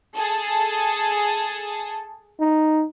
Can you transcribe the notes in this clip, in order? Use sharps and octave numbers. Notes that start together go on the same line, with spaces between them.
G#4 A4
D#4